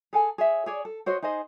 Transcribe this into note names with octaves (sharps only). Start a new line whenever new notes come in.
G#4 A4 G#5
G#4 C#5 E5
G#4 C#5 D5
A4
F#4 C5 C#5 D#5
D#4 G#4 C5 D#5